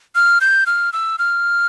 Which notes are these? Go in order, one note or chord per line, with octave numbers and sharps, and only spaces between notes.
F6
G6
F6
E6
F6